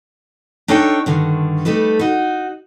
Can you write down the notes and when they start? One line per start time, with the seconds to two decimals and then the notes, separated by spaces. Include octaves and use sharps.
0.68 D4 D#4 A4 C#5 D#5 G5
1.06 G2 D3 D#3
1.65 G3 A3 D#4 A4 B4
1.99 D#4 F#4